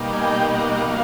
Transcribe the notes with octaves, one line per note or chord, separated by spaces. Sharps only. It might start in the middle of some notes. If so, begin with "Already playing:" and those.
Already playing: B2 G3 A#3 D#4
G#5
G5
F#5
F#5
B2 F#3 A#3 F5